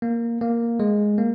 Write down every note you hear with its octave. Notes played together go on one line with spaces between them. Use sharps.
A#3
A#3
G#3
A#3